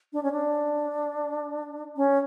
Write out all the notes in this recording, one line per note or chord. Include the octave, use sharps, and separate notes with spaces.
D4
C#4
D4
C#4